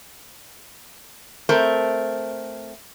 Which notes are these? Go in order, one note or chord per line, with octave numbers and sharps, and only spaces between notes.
A3 C4 A#4